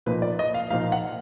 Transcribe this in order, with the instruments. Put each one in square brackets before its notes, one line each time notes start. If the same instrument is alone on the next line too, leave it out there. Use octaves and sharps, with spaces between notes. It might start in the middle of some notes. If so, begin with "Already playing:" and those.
[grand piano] A#2 F3 A#3 D#4 B4
D5
D#5
F5
A#2 F3 A#3 D#4 F5
F#5